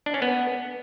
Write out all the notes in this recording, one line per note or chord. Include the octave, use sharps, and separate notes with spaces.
D4
C#4
B3